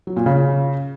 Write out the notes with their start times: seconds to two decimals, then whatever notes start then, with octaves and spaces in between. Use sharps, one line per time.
0.07 F#3
0.16 A#2
0.26 C#3